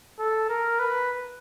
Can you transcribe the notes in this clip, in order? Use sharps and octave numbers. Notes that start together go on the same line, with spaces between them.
A4
A#4
B4